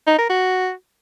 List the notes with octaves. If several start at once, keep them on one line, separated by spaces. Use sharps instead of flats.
D#4
A#4
F#4